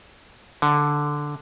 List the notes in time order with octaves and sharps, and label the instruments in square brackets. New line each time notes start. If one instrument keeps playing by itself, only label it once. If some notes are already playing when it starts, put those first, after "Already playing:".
[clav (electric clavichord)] D3